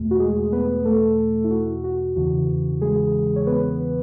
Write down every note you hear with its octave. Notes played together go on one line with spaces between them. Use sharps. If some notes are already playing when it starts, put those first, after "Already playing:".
Already playing: E2 B2 A3
F#4
G#3 G#4
B3 B4
A3 A4
E4
F#4
F#4
E2 C#3 E3 F#4
G#3 G#4
C#5
B3 B4